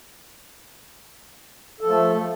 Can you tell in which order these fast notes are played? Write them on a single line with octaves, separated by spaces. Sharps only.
A4 F3 A3